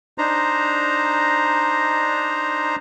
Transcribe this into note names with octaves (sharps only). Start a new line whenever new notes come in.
D4 D#4 C5 A#5